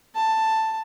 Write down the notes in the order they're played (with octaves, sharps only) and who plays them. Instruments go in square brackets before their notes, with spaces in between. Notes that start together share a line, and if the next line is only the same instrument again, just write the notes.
[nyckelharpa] A5